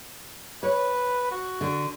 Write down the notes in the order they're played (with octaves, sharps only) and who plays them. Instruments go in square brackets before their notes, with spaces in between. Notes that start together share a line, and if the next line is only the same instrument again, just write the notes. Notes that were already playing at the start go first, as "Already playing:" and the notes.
[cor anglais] B4 [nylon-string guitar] C#5
[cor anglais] F#4
[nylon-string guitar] D3